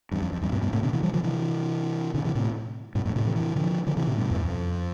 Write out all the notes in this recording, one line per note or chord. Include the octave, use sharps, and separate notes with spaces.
E2 G2
F2
F2
E2 G2
G2 B2
G2 B2
A2 C3
B2 D3
C3 E3
E3 G3
D3 F3
C3 E3
B2 D3
C3 E3
A2 C3
G2 B2
F2 A2
A2 C3
C3 E3
C3 E3
D3 F3
D3 F3
C3 E3
A2 C3
G2 B2
E2 G2
F2